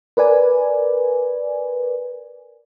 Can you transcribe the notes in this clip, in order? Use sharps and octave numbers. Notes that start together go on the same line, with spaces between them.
A#4 B4 D5 G#5